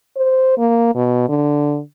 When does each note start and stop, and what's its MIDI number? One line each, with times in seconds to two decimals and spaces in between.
0.16 0.57 72
0.58 0.94 58
0.95 1.26 47
1.29 1.80 50